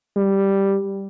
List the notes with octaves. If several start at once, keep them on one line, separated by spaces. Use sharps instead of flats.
G3